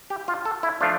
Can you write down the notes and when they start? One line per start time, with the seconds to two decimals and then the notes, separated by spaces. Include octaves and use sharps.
0.10 G4
0.28 F4
0.45 A4
0.63 E4
0.81 F3 A3 D4 F4